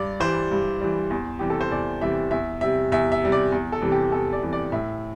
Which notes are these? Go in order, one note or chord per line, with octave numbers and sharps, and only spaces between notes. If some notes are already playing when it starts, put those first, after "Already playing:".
Already playing: G2 D5
E3 G3 C5
G2
E3 G3
E2
C3 E3 G3 G4
A4
C5
E2 D5
C3 E3 G3 E5
E2 E5
C3 G3 E5
E2 E5
E5
C3 G3
D5
E2
A4
C3 E3 G3
G4
E2 A4
D5
C3 E3 G3
D5
A2 E5